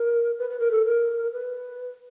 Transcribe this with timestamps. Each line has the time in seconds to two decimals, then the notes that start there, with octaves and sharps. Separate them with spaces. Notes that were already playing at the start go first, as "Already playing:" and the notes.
Already playing: A#4
0.39 B4
0.50 B4
0.59 A#4
0.71 A4
0.85 A#4
1.32 B4